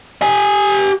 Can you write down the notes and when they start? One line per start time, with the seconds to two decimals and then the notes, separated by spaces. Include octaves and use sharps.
0.22 G4 G#5